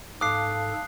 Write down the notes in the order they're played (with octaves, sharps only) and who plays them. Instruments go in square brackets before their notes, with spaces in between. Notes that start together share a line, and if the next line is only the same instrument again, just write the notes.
[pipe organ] G#2 A4 [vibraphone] F5 A5 [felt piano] D6 [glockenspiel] D#6 F#6 C7